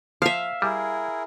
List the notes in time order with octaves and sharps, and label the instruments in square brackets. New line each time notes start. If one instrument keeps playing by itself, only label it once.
[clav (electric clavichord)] F3 [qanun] E5 F5
[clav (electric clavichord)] G3 [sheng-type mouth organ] E4 G#4 A#4